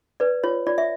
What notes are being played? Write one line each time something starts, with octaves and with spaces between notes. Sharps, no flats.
B4 D5
F4 C#5
F4 D5
E5